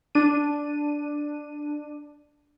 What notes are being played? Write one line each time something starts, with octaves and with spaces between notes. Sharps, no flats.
D4 D#7